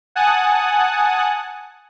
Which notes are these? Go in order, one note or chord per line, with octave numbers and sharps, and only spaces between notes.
F#5 G#5 A5 D#6 F#6